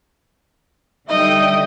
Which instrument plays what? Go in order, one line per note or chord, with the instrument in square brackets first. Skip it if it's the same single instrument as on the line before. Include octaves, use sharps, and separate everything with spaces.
[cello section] D3 G3 [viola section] D#4 G5 [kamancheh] D#5 [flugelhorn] E5